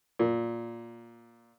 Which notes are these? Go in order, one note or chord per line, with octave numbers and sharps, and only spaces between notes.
A#2